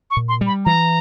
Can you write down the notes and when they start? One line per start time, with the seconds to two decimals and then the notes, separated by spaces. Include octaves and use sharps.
0.11 C#6
0.17 A#2
0.29 C6
0.41 G3
0.47 B5
0.65 E3 A#5